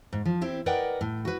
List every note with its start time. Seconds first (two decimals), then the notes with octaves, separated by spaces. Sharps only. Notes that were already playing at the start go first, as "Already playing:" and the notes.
0.13 G#2
0.25 F3
0.41 C4 E4 G4
0.66 A#4 B4 D5 D#5 F#5 G5
1.01 A2
1.25 F#4 B4